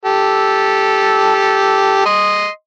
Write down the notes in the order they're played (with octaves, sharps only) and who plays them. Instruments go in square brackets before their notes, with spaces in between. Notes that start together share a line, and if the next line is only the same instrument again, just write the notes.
[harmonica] G4 A4
D#5 C6